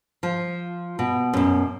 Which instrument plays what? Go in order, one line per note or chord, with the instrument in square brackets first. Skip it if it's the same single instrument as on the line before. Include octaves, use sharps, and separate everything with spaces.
[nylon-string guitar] F3
B2
F#2 B2